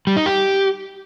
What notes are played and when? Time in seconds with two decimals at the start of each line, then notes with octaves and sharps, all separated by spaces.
0.07 G3
0.17 D#4
0.26 G4